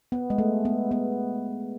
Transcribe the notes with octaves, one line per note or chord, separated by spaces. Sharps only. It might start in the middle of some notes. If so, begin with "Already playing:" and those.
B3
G#3
A3
B3
B3